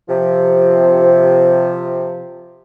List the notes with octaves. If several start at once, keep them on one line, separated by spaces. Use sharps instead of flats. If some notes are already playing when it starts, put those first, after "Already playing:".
C3 F3